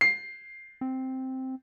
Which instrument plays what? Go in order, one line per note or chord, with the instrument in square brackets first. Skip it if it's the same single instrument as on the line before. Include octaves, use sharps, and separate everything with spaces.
[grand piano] C7
[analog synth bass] C4